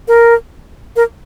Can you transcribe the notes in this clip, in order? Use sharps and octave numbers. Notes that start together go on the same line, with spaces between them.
A#4
A#4